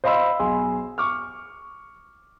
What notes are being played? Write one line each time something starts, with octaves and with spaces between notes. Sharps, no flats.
C5 D#5 F5 B5 C6 E6
B1 G#4 C6
C#6 D6 F6